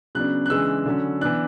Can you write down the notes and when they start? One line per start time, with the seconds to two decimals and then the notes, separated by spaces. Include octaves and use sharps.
0.15 C#3 F#3 B3 D4 F#6
0.46 F#6
0.50 C#3 E3 G#3 D4 E6
0.85 D3 F#3 C#4
1.21 E3 B3 D4 F#6